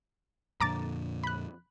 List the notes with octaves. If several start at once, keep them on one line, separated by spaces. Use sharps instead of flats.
F2 A#2 D3 A#5 D6 A6
B5 F#6